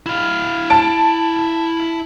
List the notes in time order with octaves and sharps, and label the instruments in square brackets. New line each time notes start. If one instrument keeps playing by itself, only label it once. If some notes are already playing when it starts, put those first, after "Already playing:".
[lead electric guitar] E4 F5
[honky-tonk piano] A5 D7